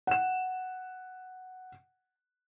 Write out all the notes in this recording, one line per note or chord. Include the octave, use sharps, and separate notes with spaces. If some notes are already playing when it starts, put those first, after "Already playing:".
F#5 E7